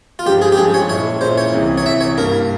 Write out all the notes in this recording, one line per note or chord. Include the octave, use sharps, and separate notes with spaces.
F4
G2 F3 G#3 G4
G#4
G4
G2 F3 G#3 G#4
C#5
A#2 G#3 C#4 E4 C#5
A#2 G#3 C#4 E4 C5
C#5
C2 C3 E3
C#5
C2 C3 E3 E5
C#5
G2 G3 A#3 A#4